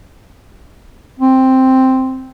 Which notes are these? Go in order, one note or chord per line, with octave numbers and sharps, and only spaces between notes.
C4